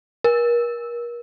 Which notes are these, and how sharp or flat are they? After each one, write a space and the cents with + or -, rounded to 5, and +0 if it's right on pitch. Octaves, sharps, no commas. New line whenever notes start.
A#4 +35